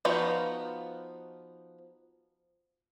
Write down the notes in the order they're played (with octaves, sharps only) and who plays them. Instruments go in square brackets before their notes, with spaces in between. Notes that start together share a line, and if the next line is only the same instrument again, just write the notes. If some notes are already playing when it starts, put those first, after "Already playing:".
[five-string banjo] F3 B3 D#4 F4 F#4